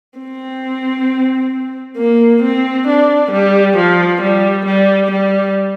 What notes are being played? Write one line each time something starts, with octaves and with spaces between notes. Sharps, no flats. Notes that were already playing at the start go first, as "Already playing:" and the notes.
C4
A#3
C4
D4
G3
F3
G3
G3
G3